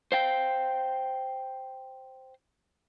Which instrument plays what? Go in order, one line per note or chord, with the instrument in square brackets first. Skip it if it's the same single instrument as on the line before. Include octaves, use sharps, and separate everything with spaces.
[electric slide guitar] C5 F5 G5